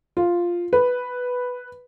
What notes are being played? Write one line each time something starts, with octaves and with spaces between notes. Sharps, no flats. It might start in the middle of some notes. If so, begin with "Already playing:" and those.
F4
B4